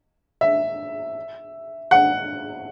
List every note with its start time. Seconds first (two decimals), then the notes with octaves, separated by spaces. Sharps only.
0.41 E5
1.91 F#5